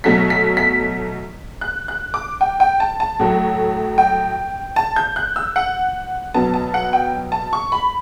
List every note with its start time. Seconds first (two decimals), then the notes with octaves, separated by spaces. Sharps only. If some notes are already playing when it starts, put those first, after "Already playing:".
0.04 B2 F#3 A3 B6
0.30 B6
0.57 B6
1.61 F#6
1.88 F#6
2.14 D6
2.41 G5
2.60 G5
2.80 A5
3.00 A5
3.20 A2 F#3 A3
3.98 G5
4.76 A5
4.96 G6
5.16 F#6
5.36 E6
5.56 F#5
6.34 B2 F#3 B3 A5
6.54 A5
6.74 F#5
6.93 G5
7.32 A5
7.53 C#6
7.72 B5